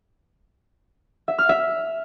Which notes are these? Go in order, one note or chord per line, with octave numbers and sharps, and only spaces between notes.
E5
F6
E5